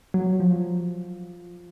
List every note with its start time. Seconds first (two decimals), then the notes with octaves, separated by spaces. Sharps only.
0.14 F#3
0.40 F3